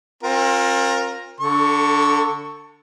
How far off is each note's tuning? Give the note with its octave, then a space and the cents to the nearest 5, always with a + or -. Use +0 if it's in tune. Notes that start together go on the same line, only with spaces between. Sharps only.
C4 +40 F4 +25 A#4 +5
D3 -15 A4 +25 C#6 +0